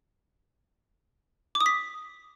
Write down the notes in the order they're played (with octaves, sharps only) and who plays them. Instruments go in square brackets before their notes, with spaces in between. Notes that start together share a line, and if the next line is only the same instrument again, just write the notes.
[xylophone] D6
D#6
B6